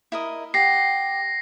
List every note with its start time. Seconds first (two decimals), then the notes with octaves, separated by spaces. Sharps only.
0.12 E4 A#4 D#5
0.54 G4 F#5 A#6 C7